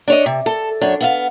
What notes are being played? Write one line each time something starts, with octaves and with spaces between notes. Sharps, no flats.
D4 C#5 D#5
C3
A4
F#2 D4 C#5
B3 E5 F5